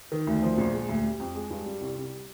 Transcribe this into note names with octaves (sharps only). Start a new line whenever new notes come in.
D#3
D2
F3
A#1
G#3
D2
G3
F2
G#3
G2
G3
C2
G3